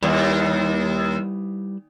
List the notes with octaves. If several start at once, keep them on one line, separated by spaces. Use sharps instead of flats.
D#2 G3 E4 B4